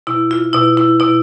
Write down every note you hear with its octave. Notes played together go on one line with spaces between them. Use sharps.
B2 E4
F4
B2 E4
E4
B2 E4